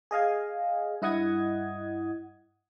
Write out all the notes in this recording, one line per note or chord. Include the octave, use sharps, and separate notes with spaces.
G#4 D#5 F5 G#5
G2 E4 D#5 F#5 D#6 G#6